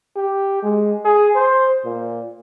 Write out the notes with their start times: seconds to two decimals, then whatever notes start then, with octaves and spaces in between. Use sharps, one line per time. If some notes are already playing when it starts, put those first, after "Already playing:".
0.16 G4
0.62 G#3
1.05 G#4
1.35 C5
1.84 A#2